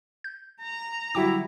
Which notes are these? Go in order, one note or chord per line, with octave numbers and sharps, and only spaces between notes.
G6
A#5
D3 F#3 G3 E4 F#4 G5 D6